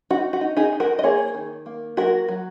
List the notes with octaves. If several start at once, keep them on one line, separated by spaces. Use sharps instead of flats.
D#4 F#4
F#4
D#4
D#4 G#4
D#4
F#4 A#4
D#5
A#3 G#4 C#5
D#3
A#3
F#3 F#4 A#4
F#3